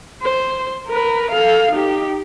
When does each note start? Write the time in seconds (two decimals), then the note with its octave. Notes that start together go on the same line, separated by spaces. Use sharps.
0.22 C5
0.87 A#4 B4
1.31 A4 F5
1.72 D#4 G4